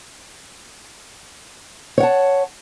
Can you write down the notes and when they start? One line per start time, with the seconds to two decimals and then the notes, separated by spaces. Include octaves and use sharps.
1.98 C#5
2.00 F#5
2.03 A5